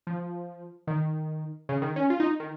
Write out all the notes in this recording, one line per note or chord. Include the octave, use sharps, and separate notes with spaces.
F3
D#3
C#3
D#3
C#4
F4
D#4
D#3